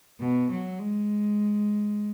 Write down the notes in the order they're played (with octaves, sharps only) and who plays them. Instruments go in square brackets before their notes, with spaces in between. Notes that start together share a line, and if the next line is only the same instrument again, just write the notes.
[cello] B2
F#3
G#3